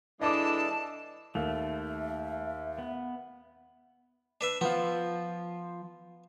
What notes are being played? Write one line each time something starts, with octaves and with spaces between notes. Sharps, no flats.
E3 G#3 D4 A4 D5 D#5 A5 D6
D#2 A3 E5
B3
D4 B4 E5
F3 B3 F4